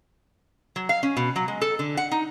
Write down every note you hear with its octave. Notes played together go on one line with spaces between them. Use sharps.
F#3
F5
C#4
B2
F#3
G#3
A4
D3
F#5
D#4